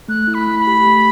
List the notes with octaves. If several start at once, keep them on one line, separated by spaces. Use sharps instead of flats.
A3 F#6
E4
B5
A3
B5
G4
A3